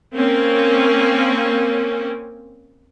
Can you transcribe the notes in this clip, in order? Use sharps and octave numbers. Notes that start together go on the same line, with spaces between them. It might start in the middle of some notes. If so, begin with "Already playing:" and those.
A#3 C4 C#4